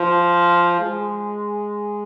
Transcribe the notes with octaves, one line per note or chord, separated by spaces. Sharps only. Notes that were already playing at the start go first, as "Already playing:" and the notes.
Already playing: F3
G#3